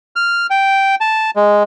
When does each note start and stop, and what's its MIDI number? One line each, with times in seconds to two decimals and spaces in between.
0.16 0.47 89
0.50 0.95 79
1.01 1.31 81
1.36 1.63 56